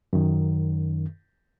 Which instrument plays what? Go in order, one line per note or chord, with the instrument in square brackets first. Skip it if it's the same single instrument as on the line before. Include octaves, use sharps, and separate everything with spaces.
[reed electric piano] F#2 D#3